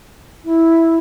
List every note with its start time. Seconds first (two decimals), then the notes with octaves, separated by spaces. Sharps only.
0.45 E4